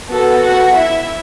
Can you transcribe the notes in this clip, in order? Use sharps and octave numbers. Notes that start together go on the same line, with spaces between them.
B3 F#4 A4
F#4 F#5
E4 E5